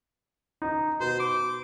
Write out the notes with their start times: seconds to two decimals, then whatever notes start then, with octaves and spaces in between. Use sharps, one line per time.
0.62 D#4
1.00 B2 C5
1.20 D6